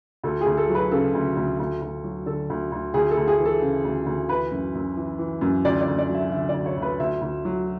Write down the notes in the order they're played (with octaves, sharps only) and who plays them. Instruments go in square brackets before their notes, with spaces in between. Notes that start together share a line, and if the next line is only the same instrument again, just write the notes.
[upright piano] D2 A4
G#4
D2
A4
F#3
B4
C#3 A4
D2
D2
D2
D2
F#3
D3 A4
D2
D2
D2 G#4
A4
D2
G#4
E3
A4
C#3
D2
D2
E3 B4
F#2
F#2
E3
E3
F#2
D2 D5
D5
D2
D5
F#3
E5
D3 E5
D2 D5
C#5
D2
B4
D2 E5
D2
F#3